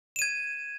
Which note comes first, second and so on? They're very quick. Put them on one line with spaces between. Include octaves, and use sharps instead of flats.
E7 D#7 G#6